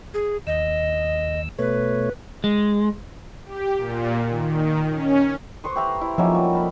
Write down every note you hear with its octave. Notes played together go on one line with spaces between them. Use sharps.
G#4
D#2 D#5 E6
B2 A3 B4 C#5
G#3
G4
A#2
D#3
C#4
B4 C5 C#6 D#6
G4 C5 E5 A#5 B5
E4
F3 F#3 A#3 C#4 D#4 E5
G3
A#4 A5 B5